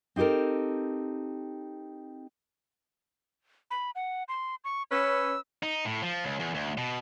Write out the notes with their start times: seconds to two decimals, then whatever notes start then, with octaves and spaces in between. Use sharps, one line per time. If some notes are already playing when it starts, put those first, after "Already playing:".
0.16 C4 D#4 G4 A4 A#4
3.71 B5
3.95 F#5
4.29 C6
4.64 C#6
4.92 C#4 B4 E6
5.63 D#4
5.85 A2
6.02 F3
6.24 C#2
6.40 E2
6.55 D2
6.77 B2